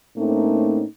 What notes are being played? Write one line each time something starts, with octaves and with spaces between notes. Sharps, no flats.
A2 A3 A#3 C4 C#4 D#4